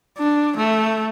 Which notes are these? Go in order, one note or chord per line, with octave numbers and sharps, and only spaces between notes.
D4
A3